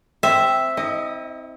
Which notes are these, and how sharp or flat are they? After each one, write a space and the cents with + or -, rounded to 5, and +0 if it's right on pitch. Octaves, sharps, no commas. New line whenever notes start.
C4 +0 E5 +0
E4 -40 D#5 +0